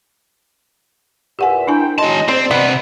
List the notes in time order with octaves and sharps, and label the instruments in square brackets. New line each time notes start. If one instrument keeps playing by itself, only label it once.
[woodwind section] E2 A#2 E5 [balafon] G4 F#5 G#5
[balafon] D4 E4 G#5 [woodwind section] A#4 C5 G5
[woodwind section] F#3 D#4 D#5 [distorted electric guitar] G#3 A5 [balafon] C6
[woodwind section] G#2 D5 [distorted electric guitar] C4 [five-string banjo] C5
[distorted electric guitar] C3 B4 [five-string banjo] B3